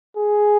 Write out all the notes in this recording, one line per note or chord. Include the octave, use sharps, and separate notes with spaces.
G#4